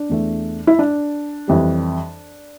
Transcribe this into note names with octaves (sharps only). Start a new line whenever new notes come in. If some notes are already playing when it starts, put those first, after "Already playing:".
Already playing: D4
E2 E3 A3
E4
D4
F2 E3 G3